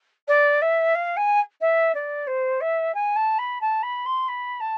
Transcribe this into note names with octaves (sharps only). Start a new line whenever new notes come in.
D5
E5
F5
G#5
E5
D5
C5
E5
G#5
A5
B5
A5
B5
C6
B5
A5